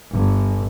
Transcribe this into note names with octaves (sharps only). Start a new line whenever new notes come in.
G1